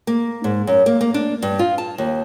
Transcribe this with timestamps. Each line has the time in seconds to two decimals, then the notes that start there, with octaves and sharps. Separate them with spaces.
0.07 A#3
0.44 G#2
0.67 F#2
0.86 A#3
1.01 A#3
1.14 D4
1.42 G2
1.59 F4
1.78 A5
1.98 D#2